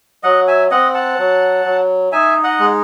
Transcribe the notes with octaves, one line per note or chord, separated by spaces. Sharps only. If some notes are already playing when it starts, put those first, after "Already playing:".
F#3 D#5 F#5
E5 G#5
C4 D#5 F#5
F#5 A5
F#3
F#3
D#4 E5 G#5
D#5 F#5
G#3